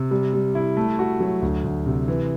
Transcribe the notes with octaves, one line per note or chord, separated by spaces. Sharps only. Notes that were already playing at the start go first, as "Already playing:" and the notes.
Already playing: C3
G3
G3
E4
A3
F#4
F#3
D2
D2
C3
E3